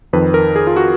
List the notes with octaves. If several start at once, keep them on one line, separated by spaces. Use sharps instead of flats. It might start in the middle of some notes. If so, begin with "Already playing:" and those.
F2 D#3 B4
A#4
G#4
F4
F#4